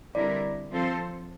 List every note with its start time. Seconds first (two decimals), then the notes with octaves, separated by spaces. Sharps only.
0.14 D3 G3 C4 E4 A#4 D5
0.72 F3 C4 F4 A4 C5